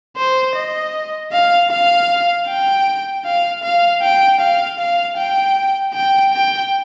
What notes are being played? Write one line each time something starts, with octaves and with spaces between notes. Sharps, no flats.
C5
D#5
F5
F5
G5
F5
F5
G5
F5
F5
G5
G5
G5